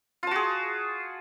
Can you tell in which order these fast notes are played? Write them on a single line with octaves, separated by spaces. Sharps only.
F4 A5 F#4 G#4